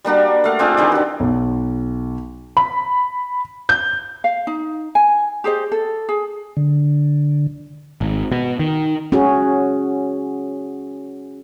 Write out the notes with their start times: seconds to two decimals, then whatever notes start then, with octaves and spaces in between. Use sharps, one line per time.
0.04 G3 A#3 D4 F#4
0.44 A3 F5 F#5
0.59 C4 D4 F4 G#4
0.77 D#3 E3 G4
0.92 D4 F#4
1.20 B1
2.57 B5
3.69 G6
4.24 F5
4.47 D#4
4.95 G#5
5.44 G4 G#4 C5 D#5
5.72 A4
6.09 G#4
6.57 D3
8.01 G#1
8.32 B2
8.59 D#3
9.12 C#4 F#4 G#4